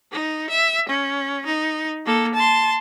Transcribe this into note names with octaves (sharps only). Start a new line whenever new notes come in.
D#4
E5
C#4
D#4
A#3 A4
A5 C6